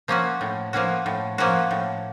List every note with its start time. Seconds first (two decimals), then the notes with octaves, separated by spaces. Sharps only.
0.08 F3 A#3 C#4 F#4
0.41 A2
0.73 F3 A#3 C#4 F#4
1.06 A2
1.38 F3 A#3 C#4 F#4
1.71 A2